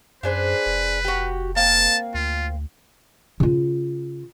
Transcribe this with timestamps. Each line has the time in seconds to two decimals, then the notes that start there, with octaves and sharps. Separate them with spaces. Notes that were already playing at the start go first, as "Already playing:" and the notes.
0.23 F#2 D4 G#4 B4 C5
0.66 F1
1.04 F#4 G4
1.56 A#3 C4 G5 A5
2.14 D2 F4
3.40 C#3 F4